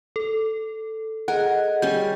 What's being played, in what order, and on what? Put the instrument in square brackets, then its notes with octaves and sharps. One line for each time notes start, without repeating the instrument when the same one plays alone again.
[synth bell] A4
[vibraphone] G#4 D#5 [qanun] A#4 [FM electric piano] F#5
[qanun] G3 C#4 [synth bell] G6